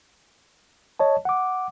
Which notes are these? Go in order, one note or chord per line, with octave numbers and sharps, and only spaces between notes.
C#5 D#5 A5
F#5 D6